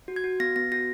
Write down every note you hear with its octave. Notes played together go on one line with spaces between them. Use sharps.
F#4
G#6
F#4
B3 A#6
B3 A#6
F#4 A#6